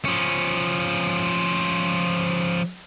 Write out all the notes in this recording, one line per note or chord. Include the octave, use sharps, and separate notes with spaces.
F3 C#4